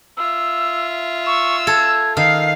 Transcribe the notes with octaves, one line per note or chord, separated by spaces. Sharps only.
F4 E5 E6
C#6 E6
A4 G#6
D#3 F5 C7